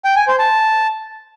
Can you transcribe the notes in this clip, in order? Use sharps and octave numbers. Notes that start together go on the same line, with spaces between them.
G5
G#5
C5
A5